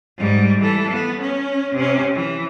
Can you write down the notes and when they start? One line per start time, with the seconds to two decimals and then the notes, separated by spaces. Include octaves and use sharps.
0.17 G#2 G3
0.61 E3 A4
0.90 B3
1.21 C#4
1.75 C3 C#4
2.14 E3